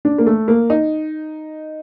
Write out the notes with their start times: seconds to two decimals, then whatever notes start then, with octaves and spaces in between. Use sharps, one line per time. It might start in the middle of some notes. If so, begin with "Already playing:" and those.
0.05 D4
0.18 A#3
0.26 A3
0.48 A#3
0.70 D#4